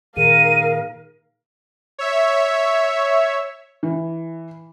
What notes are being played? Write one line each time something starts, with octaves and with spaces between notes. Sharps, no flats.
A#2 D#3 G#4 A#4 F5 D#7
C#5 E5
E3